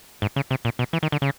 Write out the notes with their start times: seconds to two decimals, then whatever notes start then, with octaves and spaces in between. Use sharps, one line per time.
0.22 G#2
0.36 C#3
0.51 C3
0.65 A#2
0.79 B2
0.93 E3
1.03 D#3
1.12 D3
1.22 C#3